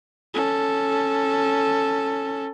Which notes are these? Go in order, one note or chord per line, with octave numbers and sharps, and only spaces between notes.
C#4 A4